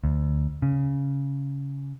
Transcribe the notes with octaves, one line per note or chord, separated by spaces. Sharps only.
D2
C#3